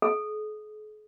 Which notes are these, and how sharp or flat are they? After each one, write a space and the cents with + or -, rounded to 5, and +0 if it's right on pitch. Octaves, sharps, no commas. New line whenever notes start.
G#4 +45